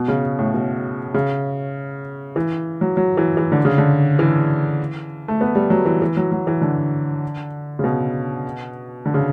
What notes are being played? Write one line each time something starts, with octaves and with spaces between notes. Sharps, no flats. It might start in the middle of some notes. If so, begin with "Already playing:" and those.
Already playing: B2
C#3
A2
B2
C#3
E3
F#3
F#3
E3
E3
D3
C#3
D3
E3
A3
B3
G3
F#3
E3
E3
F#3
F#3
E3
D3
C#3
B2
D3
C#3